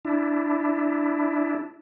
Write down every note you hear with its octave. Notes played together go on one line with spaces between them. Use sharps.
D4 E4